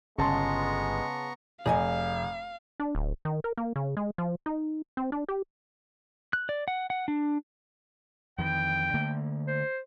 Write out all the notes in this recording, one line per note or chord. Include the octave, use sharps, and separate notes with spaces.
G1 C#3 G#3 B3 A5 A#5 C6 C#6
F1 G#4 D#5 F5 G#5
D4
D1
D#3
A#4
A#3
C#3
G#3
F3
D#4
C4
D4
G4
F#6
D5
F#5
F#5
D4
F2 D#3 E3 G5
D3 A3 A#3
C5